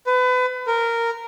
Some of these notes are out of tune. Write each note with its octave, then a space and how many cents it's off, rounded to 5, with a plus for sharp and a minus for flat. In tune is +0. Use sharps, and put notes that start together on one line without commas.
B4 +30
A#4 -10